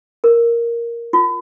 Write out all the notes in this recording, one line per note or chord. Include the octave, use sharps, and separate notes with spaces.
A#4
F4